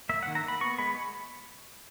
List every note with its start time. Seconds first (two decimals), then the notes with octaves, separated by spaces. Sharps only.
0.09 A#3 E5
0.23 F#5
0.27 D#3
0.35 A#5
0.44 A#3 B5
0.61 B3 C#6
0.78 G#3 B5